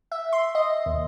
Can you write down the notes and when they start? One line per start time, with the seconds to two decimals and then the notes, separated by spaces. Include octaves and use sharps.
0.12 E5
0.33 C6
0.55 D#5
0.86 D#2